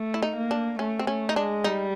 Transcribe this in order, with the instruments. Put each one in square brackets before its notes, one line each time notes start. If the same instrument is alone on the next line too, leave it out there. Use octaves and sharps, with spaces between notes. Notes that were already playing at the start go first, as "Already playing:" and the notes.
Already playing: [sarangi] A3
[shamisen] E4
D#4
[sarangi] A#3
[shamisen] D4
[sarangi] A3 [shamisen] C#4
[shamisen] C4
[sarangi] A3 [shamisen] C#4
[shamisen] D#4
[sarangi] G#3 [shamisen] D4
[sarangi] G3 [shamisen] D#4